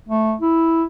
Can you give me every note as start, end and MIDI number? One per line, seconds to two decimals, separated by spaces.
0.09 0.34 57
0.41 0.84 64